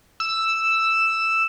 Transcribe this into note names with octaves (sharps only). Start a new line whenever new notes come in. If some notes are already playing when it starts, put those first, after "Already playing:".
E6